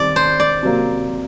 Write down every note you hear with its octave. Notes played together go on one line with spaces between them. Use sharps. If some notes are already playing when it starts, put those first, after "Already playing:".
Already playing: D#3 G3 C4 D5
C5
D5
C3 F#3 A#3